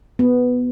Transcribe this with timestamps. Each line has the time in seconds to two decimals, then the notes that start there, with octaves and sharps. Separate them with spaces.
0.19 B3